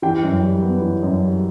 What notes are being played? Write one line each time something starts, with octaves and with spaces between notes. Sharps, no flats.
E3 G5
F#2
G3
B3
E3
F#2
G3